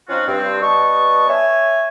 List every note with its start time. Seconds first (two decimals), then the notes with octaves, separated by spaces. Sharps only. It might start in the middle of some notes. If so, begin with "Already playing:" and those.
0.09 F3 C4 C#4 D#4 F4 F#4
0.27 G2 C4
0.62 G3 B3 D#5 A5 C#6
1.29 C#5 E5 G#5